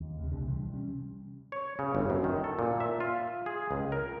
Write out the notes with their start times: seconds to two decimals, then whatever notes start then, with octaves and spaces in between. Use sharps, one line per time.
0.01 D#2
0.19 D2 C3
0.31 C2 B2 D3
0.47 C3 E3 G3
0.73 G3 C#4
1.52 C#5
1.79 C#3
1.95 G1
2.10 F#2
2.24 D#3
2.44 A4
2.59 A#2
2.80 E5
3.00 F4
3.46 G#4
3.71 C#2
3.92 A#4